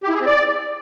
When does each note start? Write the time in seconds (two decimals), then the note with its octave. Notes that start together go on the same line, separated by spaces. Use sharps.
0.03 G4
0.09 E4
0.15 G#4
0.21 C4
0.26 D5